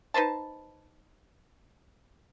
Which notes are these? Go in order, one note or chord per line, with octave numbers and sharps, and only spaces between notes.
D#4 B4 C5 A5